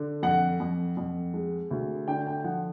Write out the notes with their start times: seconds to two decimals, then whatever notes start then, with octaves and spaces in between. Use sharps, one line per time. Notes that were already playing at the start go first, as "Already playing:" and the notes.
Already playing: D3
0.23 F2 F#5
0.60 F2
0.97 F2
1.34 G#3
1.71 D2
2.08 D3 G5
2.27 G5
2.44 F3 F#5